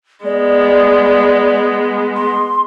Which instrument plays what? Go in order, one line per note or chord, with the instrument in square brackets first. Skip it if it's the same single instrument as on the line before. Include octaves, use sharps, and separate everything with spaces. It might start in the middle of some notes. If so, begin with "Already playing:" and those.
[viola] G#3 B3 [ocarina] D5
[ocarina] C6